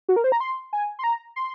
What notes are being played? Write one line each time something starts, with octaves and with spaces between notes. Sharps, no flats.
F#4
A#4
C5
A#5
C6
G#5
C6
A#5
C6